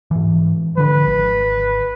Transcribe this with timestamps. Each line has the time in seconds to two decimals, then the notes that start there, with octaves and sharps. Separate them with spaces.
0.11 G#2 E3
0.78 D3 F3 B4
1.06 G#1